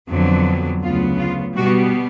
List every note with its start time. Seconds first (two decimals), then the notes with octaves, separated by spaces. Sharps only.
0.09 F2 D3 F#3 B3
0.82 D2 C#3 F#3 B3 F4
1.18 F4
1.56 B2 G3 B3 F#4